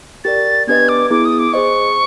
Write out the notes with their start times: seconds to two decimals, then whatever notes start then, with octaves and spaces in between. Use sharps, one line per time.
0.24 G4 A#4 D5 A6
0.67 B3 D4 G4 B4 D#5 G#6
0.89 D6
1.10 B3 E4 G#4 D6
1.25 D#6
1.39 D6
1.53 G#4 C5 D#5 C#6